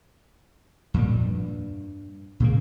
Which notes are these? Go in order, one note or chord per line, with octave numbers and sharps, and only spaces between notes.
F2 A#2 G3
G2
A#2 C#3 G#3 A#3